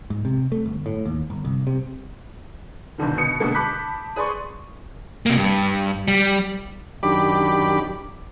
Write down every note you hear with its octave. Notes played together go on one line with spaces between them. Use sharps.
G#2
C3
A3
G1
A2
D#2
G1
C2
C3
G#1 B2 D3 D#3
B2 D#6 C#7
B2 D3 G#3 A#3
A5 B5 D6 F#6 G6 B6
G#4 B4 D5 C6 C#6
C3 A#3
G2
G3
F#2 D#3 D4 G4 B5 D6